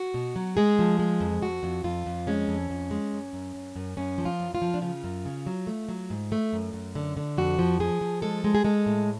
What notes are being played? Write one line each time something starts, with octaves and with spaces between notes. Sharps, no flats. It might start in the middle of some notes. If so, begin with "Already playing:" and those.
Already playing: F#4
B2
F#3
G#3 G#4
F3
G#3
F2
F2 F#4
F2
F2 F4
F2
G#3 C#4
F2
F2
G#3
F#2
F#2
F#2
F#2
F#2 C#4
F3
F4
F#2
F4
F3
D4
C#3 F4
F#2
C#3
F#3
A3
F#3
G#2
A3
F#2
F#2
D3
D3
F2 F#4
F3
F3 G#4
F3
G#3 A4
G#3
G#4
G#3 A4
A2